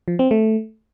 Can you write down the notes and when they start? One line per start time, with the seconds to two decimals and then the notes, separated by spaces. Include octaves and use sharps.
0.08 F3
0.19 C4
0.31 A3